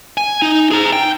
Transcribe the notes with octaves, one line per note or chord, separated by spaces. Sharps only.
G#5
D#4
G#4 A#5
G5